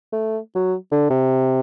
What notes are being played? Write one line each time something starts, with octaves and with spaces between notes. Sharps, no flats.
A3
F#3
D3
C3